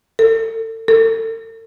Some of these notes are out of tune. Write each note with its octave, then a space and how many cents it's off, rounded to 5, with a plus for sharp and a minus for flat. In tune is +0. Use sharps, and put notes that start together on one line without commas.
A4 +35
A4 +40